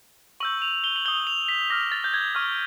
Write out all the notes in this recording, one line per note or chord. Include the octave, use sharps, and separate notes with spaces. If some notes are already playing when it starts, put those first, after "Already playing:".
C#6 E6 G6 F#7
F7
G7
F#7
D#6 G6 G7
F7
B6
D6 F6 A#6
A6
G6
G#6
C#6 F6